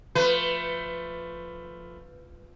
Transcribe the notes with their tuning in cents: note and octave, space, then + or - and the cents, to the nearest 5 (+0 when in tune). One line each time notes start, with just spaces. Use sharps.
F3 +5 A3 +15 B4 +15